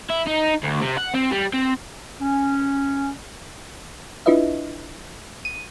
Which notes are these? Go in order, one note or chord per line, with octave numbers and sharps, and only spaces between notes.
E4
D#4
D2
C3
F#5
C4
G3
C4
C#4
D4 E4 F4 B4 D#5 E5
D#7